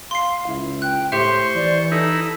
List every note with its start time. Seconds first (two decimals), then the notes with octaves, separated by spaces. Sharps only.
0.11 F5 C6 C7
0.47 C#2 E4
0.82 G5 F#6
1.12 A2 G4 C5 E5 C6 C#6
1.55 E3 D5
1.92 D#4 E4 A4